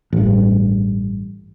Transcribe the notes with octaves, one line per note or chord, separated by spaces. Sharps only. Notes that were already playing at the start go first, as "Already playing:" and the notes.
A1 G2